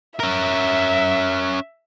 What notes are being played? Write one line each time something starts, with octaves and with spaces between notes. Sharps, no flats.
C#4 A#4 E5